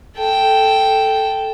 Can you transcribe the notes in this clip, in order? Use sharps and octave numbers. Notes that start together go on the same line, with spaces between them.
A4 G5